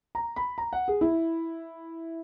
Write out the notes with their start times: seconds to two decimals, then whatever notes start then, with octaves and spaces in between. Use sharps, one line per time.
0.15 A#5
0.36 B5
0.58 A#5
0.73 F#5
0.88 G#4
1.01 E4